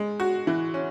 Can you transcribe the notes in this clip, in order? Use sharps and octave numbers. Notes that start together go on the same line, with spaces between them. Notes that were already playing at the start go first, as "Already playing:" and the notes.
Already playing: G#3
F#4
E3
C#4